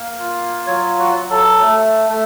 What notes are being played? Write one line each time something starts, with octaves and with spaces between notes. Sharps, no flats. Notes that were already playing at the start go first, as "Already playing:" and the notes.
Already playing: A#3
F4
F#3 C#5
F#4
F#3
A4
A3
A3